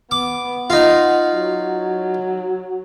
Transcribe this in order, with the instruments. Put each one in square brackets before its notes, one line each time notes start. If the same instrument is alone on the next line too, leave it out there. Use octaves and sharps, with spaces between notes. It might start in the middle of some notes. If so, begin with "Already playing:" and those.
[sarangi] B3 [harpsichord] D6
[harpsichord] D#4 F4 [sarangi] F#5
[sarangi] F#3